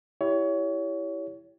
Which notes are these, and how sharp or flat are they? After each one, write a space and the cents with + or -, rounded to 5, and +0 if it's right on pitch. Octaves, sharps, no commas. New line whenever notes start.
E4 +0 G4 +0 C#5 +25